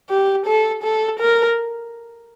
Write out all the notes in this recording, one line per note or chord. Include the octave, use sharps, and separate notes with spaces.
G4
A4
A4
A#4